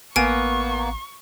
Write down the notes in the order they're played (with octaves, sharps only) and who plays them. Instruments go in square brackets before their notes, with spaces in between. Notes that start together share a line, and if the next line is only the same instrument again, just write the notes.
[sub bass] A1 [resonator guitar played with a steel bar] A#3 B3 [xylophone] G#5 D7 [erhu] C#6